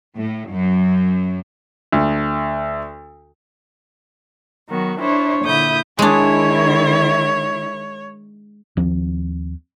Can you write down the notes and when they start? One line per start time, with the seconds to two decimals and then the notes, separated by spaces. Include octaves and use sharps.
0.16 A2
0.49 F#2
1.93 D2
4.69 D#3 F#3 B3 F#4
4.99 D4 E4 C5 C#5
5.44 A#2 D3 E4 D#6 G6
5.99 D#3 G#3 D4 E4 C#5
8.77 D#2 F3 C4